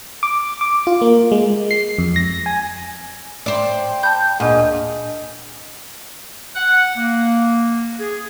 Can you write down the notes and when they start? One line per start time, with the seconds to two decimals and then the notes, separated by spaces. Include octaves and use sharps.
0.23 D6
0.61 D6
0.87 F4
1.02 A#3
1.32 G#3
1.71 C7
1.98 F2
2.16 A#6
2.46 G#5
3.46 C5 D5 G5
4.03 A5 B5 G6
4.40 D2 A#2 D4 G#4 D#5
6.56 F#5
6.97 A#3
8.00 G#4